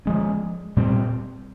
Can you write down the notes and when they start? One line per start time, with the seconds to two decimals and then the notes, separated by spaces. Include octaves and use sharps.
0.06 F3 G#3 C#4
0.77 A#2 G3 C4